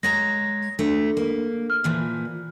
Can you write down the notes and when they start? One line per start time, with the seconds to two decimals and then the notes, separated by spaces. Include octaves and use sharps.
0.03 G#3 C#5 A#5 A#6
0.79 A3 D4
1.17 A#3
1.70 F6
1.84 A#2 E3 F3